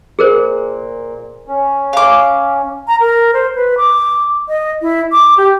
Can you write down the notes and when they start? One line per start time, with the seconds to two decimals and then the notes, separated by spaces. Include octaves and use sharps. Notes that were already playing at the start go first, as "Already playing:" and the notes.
0.19 A#2 G#4 A#4 C5
1.48 C#4
1.93 F5 D6
2.88 A#5
3.00 A#4
3.34 C5
3.55 B4
3.77 D6
4.48 D#5
4.82 E4
5.12 D6
5.37 G4